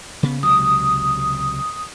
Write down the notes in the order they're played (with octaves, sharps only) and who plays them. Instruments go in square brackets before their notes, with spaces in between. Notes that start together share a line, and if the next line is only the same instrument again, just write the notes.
[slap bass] C#3 B3
[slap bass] C#2 C3 F#3 [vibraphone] D#6